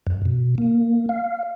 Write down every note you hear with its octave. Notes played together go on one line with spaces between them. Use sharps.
F#2
B2
A#3
F5